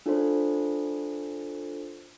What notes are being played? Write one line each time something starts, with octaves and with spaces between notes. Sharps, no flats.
D4 F4 A4 C5